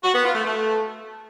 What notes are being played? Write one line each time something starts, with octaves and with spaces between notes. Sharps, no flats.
F#4
B3
F4
A3
A3